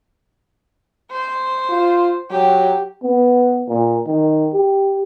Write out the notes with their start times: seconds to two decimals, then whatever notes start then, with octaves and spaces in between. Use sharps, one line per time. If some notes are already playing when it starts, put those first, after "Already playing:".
1.11 C5
1.69 F4
2.31 F#3 G4
3.03 B3
3.69 A#2
4.07 D#3
4.53 G4